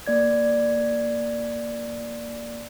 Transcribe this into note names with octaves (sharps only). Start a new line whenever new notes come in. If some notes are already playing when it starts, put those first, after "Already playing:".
A#3 D5 G#6